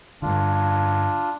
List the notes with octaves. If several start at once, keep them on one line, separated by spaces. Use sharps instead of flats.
G2 D3 D4 F4